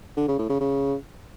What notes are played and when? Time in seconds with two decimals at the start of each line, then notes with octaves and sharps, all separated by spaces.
0.17 D3
0.28 C#3
0.39 A2
0.50 C#3
0.60 C#3